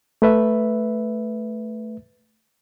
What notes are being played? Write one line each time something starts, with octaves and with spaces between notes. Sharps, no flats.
A3 B4 E5